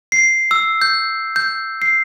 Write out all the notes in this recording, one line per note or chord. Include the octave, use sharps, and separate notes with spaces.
C7
E6
G6
G6
C7